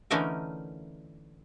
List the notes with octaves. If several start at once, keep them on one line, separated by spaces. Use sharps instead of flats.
D3 E3 A3 C#4 D#4 A#4